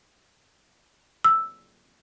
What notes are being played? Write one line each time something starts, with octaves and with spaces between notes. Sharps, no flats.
E6